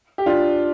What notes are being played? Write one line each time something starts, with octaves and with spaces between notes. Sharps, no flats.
G4
D4 F4